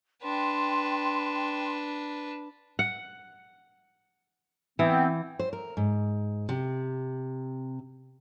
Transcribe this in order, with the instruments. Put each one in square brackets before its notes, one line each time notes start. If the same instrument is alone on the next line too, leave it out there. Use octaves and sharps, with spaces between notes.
[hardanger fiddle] D4 B4 [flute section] G5 C6
[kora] F#5
[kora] E3 [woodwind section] B3 C4
[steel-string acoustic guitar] C5
A#4
G#2
C3